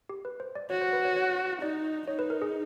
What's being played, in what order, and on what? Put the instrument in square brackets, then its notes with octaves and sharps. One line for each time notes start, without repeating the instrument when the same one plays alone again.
[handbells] G4
B4
C5
D5
[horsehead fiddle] F#4 [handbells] C#5
[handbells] C5
B4
C#5
C#5
[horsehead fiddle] D#4 [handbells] D5
[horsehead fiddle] D#4 [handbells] C#5
[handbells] B4
A#4
G#4